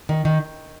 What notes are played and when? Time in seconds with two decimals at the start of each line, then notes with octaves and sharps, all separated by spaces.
0.09 D#3
0.25 D#3